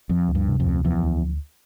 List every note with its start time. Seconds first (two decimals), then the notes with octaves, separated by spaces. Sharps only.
0.09 F2 F3
0.28 D2
0.35 G2
0.48 C3
0.60 F2
0.66 D2
0.85 E2 F3
1.03 D2